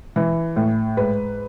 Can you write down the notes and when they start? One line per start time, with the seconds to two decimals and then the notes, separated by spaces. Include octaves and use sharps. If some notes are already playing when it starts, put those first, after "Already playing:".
0.16 E3
0.56 A2
0.97 G#2 B4